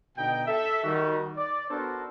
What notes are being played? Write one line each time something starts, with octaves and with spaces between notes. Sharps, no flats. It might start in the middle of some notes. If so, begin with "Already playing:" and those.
B2 D3 D#4 G5
A4 E5
D#3 G3 F#4
D5
B3 D4 F#4 A4 A#4 C5